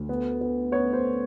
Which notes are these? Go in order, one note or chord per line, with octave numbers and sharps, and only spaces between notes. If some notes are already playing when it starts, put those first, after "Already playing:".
Already playing: D2
B3
B3
B3 C#5
C5